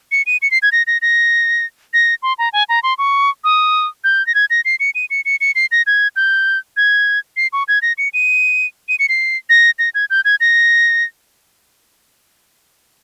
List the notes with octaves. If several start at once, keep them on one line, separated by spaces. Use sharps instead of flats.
C#7
D#7
C#7
C7
G#6
A#6
A#6
A#6
A#6
C6
A#5
G#5
A#5
C6
C#6
D#6
G6
A#6
G#6
A#6
C7
C#7
D#7
C#7
C#7
C#7
C7
A#6
G#6
G6
G#6
C7
C#6
G#6
A#6
C#7
D#7
D#7
C#7
C7
A#6
A#6
G#6
G6
G#6
A#6